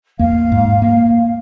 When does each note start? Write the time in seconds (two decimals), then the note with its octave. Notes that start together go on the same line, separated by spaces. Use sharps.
0.19 E2 A#3 F5
0.52 G#2
0.82 A#3